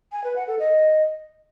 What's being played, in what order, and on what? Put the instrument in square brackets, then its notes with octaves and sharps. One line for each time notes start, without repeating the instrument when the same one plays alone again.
[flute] G#5
B4
F#5
A4
D#5